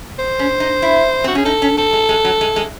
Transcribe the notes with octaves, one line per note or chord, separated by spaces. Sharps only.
C5
C#4
D#4
E4
C4 F#4
C#4 G#4
D#4 A4
C#4
C4 A4
G#3
G#3
F#3
G#3
G#3